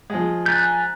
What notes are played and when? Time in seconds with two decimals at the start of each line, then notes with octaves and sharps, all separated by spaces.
0.10 F3 G#3
0.46 G#5 A#5 F#6 G6 A6 B6